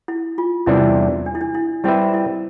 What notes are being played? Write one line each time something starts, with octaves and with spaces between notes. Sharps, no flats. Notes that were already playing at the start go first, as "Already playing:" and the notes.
E4
F4
E2 C3 E3 G3 D4 E4
D4
E4
D4
E4
G3 C4 E4 G4 B4 E5
E4